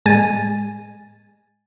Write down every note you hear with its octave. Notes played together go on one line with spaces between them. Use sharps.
A2 G#3 G#5 A6 D#7